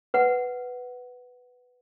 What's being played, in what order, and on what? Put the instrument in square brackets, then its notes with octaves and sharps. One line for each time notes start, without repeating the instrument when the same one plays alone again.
[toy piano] B4 F#5